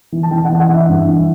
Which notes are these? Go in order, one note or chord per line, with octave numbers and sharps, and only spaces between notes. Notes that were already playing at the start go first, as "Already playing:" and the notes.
E3
A5
E3 G5
F#5
E3
F#5
E3 E5
G2
E3